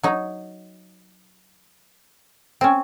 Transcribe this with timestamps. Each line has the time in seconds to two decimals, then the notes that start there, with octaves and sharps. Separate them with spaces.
0.03 F#3 D#4
2.61 C4 C#4